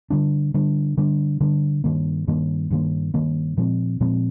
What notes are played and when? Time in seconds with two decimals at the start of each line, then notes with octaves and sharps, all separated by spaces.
0.10 D3 G3 D4
0.54 D3 G3 D4
0.97 D3 G3 D4
1.40 D3 G3 D4
1.84 G2 D#3 A#3
2.28 G2 D#3 A#3
2.71 G2 D#3 A#3
3.14 G2 D#3 A#3
3.57 A#2 F3 G#3 C4
4.00 A#2 F3 G#3 C4